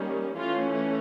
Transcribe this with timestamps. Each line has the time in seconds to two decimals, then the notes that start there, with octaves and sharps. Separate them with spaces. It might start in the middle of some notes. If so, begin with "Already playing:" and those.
Already playing: D#3 G3 A#3 C#4
0.36 E3 A3 C#4 F4